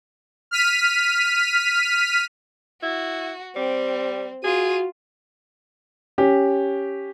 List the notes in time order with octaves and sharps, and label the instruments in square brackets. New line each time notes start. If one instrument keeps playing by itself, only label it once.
[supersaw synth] F6 B6 D#7
[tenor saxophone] E4 [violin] F#4
[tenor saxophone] G3 [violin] C4
[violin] F4 D#7 [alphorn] F#4 [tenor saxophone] G#4
[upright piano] C#4 G4